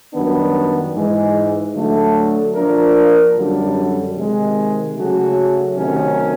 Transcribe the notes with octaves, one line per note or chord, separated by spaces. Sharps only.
F#2 D#3 G3 B3 D4
G#2 E3 G#3
D3 F#3 A3
F3 A#3 D4 F4 A#4
F#2 D3 G3
C3 D#3 G#3
C#3 F#3 A3 C#4 F#4
C3 D#3 F#3 A3 C#4